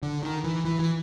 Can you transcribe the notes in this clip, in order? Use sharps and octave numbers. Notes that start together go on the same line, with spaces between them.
D3
D#3
E3
E3
E3